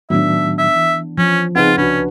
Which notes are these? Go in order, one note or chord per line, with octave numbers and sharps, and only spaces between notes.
A2 D#3 F#3 B3 D4 E5
E5
E3
F3 C#4
C#3 C4 D#4 F4 G#4 B4 F#5
C2 C#4 D4 F#4 B4